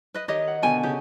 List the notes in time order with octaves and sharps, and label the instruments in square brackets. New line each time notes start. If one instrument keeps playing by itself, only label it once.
[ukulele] B4 D#5
[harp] D#3 [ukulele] G4 C#5 D#5
[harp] F#5
[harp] B2 D3 [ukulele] G5 G#5
[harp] C#3 [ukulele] G4